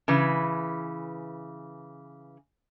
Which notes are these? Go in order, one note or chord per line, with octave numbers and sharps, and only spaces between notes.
C#3 E3 B4